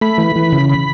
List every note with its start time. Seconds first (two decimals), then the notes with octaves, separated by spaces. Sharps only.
0.01 A3 B5
0.18 E3
0.36 E3
0.52 C#3
0.69 B5